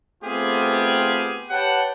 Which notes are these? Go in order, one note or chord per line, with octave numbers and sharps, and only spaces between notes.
A3 B3 C4 F4 G4 G#4
G4 B4 C#5 F#5 G5 A5